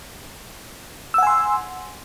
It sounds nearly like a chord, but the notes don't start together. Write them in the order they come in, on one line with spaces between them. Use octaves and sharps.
E6 F#5 G#5 C6